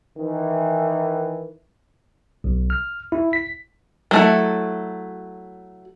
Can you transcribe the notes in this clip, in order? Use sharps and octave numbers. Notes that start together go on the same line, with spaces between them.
D#3 E3
B1
F6
E4
B6
F#3 A3 E4